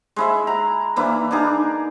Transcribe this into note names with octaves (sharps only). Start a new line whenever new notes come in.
G#3 E4 E5
A#5
E3 A#3 D4 E4
D4 D#4 G#4 A#4